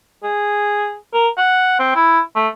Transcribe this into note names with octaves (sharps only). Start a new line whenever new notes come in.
G#4
A#4
F#5
C4
E4
A3